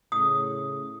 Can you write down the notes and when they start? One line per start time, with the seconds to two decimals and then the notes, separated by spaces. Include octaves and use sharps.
0.12 A2 C#3 D#6